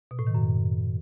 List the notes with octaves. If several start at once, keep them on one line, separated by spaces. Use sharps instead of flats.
B2
A2
D#3
F#2